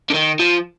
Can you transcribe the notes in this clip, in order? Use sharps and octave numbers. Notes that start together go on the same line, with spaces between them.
D3
D#3
F3